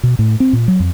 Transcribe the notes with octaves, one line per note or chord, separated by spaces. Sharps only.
B2
A2
C4
A#2
F#3
F2